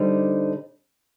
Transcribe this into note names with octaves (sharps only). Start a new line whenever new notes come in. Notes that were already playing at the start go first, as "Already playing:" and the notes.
Already playing: D3 G3 C4 D#4